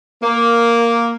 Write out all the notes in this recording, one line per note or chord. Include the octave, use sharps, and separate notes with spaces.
A#3